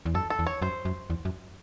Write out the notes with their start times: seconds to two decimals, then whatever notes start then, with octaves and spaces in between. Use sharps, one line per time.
0.06 E2
0.14 F#2 A4
0.30 A4
0.39 E2
0.46 C#5
0.62 F#2 C5
0.85 F#2
1.10 E2
1.25 F#2